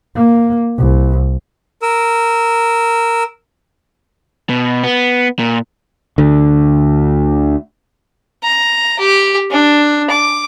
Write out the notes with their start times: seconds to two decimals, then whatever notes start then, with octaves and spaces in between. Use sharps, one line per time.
0.16 A#3
0.78 C2
1.82 A#4 E6
4.49 B2
4.84 B3
5.39 A#2
6.18 D2 D3
8.43 A#5
8.99 G4
9.51 D4
10.10 D6